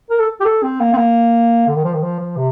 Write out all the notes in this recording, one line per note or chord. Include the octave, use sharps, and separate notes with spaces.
A#4
A4
G4
A4
C4
A#3
C4
A#3
D3
D#3
F3
D#3
F3
F3
C3